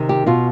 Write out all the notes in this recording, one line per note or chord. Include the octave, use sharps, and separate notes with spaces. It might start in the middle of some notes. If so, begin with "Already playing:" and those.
Already playing: C3 D#3
G4
B2 F4